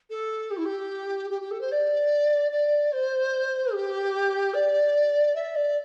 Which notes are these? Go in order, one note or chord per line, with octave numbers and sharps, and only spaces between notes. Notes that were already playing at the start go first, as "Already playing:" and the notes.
A4
G4
E4
G4
G4
G4
A4
C5
D5
D5
C5
G4
D5
E5
D5